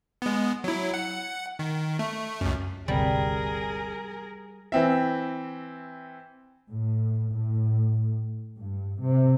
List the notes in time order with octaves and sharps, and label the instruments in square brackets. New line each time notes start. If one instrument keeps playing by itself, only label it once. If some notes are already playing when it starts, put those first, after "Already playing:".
[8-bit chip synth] G#3 B3
F#3 E4
F#5
D#3
A3
C#2 F#2
[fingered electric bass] G1 D2 C3 [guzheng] G3 [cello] G#4 A#4
[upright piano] E3 C4 E5
[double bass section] A2
A2
G2
C3